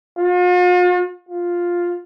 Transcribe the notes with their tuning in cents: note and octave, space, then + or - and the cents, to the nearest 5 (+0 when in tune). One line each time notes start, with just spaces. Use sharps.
F4 +45
F4 +5